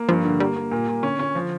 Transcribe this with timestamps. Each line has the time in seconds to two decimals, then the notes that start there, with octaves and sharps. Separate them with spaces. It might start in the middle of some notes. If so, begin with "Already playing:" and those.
Already playing: A#3
0.09 G2 F3
0.25 D3
0.40 G3 A#3
0.56 A#3
0.72 A#2
0.87 A#2
1.03 D3 C#4
1.19 C#4
1.35 F3